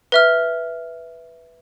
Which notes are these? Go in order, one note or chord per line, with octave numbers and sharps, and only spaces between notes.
B4 E5 F6